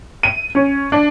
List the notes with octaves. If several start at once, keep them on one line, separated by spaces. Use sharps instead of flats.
D#7
C#4
D4